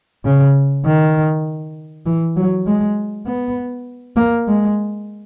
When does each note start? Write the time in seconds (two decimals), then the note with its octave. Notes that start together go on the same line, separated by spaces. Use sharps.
0.25 C#3
0.85 D#3
2.06 E3
2.37 F#3
2.66 G#3
3.26 B3
4.16 A#3
4.48 G#3